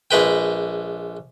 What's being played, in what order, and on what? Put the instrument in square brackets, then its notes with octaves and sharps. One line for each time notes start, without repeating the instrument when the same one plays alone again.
[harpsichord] A#1 G#3 B4 G5